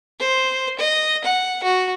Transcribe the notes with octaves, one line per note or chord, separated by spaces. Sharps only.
C5
D#5
F#5
F#4